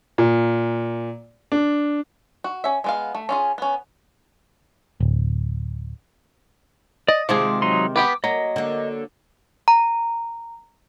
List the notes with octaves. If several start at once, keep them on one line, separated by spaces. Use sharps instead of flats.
A#2
D4
F#4
C#4 E5
G#3 B3 F5
A3
C#4 F4 G#4
B3 C#4
D1
D5 D#5
C3 D#3 F3 G#3 G#4 D6
F#3 D#4 C6
B3 G4 B4 D6
F#3 A#3 D#5
D3 A#3
A#5